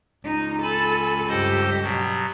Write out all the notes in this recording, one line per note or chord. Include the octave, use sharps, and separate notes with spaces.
C#2 D#4
A4 G#5 B5
G2 G4 A4 C5 D#5
B2 F#3